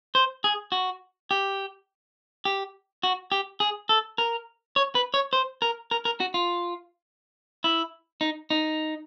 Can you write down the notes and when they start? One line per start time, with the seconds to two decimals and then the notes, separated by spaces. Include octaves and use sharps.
0.15 C5
0.44 G#4
0.72 F#4
1.31 G4
2.45 G4
3.03 F#4
3.32 G4
3.60 G#4
3.89 A4
4.18 A#4
4.76 C#5
4.95 B4
5.14 C#5
5.33 C5
5.62 A#4
5.91 A#4
6.05 A#4
6.20 F#4
6.34 F4
7.64 E4
8.21 D#4
8.50 D#4